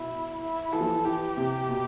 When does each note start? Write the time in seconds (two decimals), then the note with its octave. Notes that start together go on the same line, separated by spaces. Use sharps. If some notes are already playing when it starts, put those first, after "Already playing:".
Already playing: B2 E4
0.41 E4
0.73 E3 A4
0.81 F3
0.89 E3
1.05 E3 G4
1.37 C3
1.69 B2